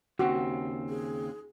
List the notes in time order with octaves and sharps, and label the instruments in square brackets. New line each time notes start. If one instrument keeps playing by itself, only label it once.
[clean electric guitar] D#2 C#3 C4 [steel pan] F#4
[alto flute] G#4